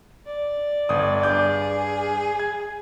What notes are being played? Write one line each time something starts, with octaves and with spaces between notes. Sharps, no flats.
D5
G1 D#6
G2 G#4 D6 G6
G#6